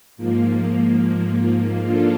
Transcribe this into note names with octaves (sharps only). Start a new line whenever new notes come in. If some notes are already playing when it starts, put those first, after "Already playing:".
G#2 F3 A#3
F3 A#3 D4 F4 A4